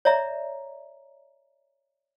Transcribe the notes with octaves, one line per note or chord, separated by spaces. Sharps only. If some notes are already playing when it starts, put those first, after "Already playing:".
C#5 D5 E5 A#5